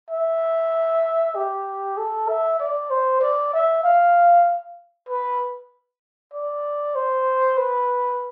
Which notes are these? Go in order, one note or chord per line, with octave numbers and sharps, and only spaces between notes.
E5
G4
A4
E5
D5
C5
D5
E5
F5
B4
D5
C5
B4